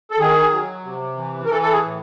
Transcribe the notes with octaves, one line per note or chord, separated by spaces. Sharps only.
A4
D#3 G#4
F#3
C3
E3
A#4
E3 A4
A4
G#4
A2